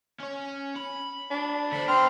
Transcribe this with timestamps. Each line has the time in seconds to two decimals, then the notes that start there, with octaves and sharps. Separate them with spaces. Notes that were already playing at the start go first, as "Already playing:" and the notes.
0.20 C#4 C#5
0.76 B5
1.31 D4
1.72 D3 C5 B5
1.88 B3 C4 A#5 C6 F6